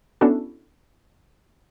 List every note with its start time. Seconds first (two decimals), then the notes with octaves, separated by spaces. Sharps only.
0.21 B3 C#4 D4 E4 F#4 A4